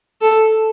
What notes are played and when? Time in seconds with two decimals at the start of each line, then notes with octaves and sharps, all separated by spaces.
0.21 A4